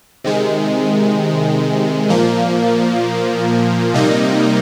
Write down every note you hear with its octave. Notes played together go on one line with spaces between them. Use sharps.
C3 D#3 G#3
A#2 F3 A#3
C3 G3 A#3 D#4